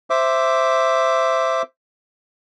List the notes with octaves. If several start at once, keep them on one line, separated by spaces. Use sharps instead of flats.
C5 E5 D6